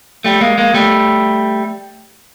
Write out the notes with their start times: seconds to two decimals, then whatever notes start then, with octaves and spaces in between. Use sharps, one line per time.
0.24 G3 A3
0.41 G#3 A#3
0.58 G#3 A#3
0.74 G3 A3